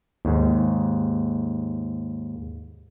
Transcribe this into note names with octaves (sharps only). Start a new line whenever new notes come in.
D#2 G#2